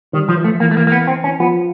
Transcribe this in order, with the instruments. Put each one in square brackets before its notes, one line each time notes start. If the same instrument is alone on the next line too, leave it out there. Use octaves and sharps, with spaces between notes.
[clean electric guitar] D#3 [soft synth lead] G3
[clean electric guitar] F3 [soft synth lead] F#3
[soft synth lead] E3
[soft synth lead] F3 [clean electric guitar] A3
[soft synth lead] E3 [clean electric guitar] A#3
[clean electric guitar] A3
A#3
A#3
B3
C4
C#4
[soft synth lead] F3 [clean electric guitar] B3